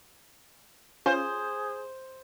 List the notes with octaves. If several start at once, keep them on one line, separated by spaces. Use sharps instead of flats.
C#4 F4 G#4 C5